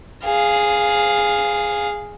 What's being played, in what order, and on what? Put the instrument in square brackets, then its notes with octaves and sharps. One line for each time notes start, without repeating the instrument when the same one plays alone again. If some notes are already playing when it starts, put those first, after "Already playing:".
[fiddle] G#4 F5